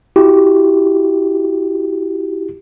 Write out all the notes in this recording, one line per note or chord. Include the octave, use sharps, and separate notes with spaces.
E4 F#4 G4